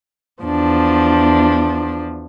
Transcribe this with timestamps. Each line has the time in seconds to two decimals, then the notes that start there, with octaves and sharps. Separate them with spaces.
0.44 E2 F3 D4